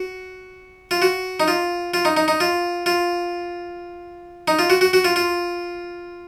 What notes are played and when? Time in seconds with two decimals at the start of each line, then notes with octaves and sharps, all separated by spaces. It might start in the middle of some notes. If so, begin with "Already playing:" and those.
Already playing: F#4
0.91 F4
1.02 F#4
1.40 D#4
1.48 F4
1.94 F4
2.05 D#4
2.17 D#4
2.28 D#4
2.40 F4
2.86 F4
4.48 D#4
4.59 F4
4.70 F#4
4.81 F#4
4.93 F#4
5.04 F4
5.16 F4